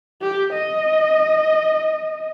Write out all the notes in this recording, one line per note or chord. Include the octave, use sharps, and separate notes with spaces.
G4
D#5